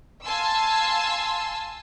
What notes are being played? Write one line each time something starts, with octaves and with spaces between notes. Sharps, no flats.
F5 G#5 A5 C6 E6